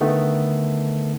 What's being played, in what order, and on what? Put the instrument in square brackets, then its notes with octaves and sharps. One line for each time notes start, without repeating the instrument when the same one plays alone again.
[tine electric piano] D3 D#3 A3 B3